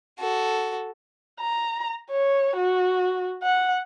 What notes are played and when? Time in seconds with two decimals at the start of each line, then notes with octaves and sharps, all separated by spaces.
0.19 F#4 A4
1.40 A#5
2.10 C#5
2.56 F#4
3.43 F#5